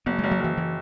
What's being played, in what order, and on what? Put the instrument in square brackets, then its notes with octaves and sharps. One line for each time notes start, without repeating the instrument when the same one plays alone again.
[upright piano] F#1 [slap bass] B3
[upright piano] F#1 [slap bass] G#3
[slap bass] F#3
[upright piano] F#1 [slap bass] E3
[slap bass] E3